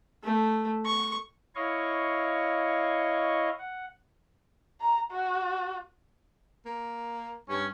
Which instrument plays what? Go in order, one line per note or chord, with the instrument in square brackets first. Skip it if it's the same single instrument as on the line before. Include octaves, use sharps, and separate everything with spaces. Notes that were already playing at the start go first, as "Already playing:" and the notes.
[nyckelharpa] A3
C#6
[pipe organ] E4 C#5 D#5 F5 C#6
F#5
[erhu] A#5
F#4
[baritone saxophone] A#3
[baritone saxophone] G2 [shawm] C#4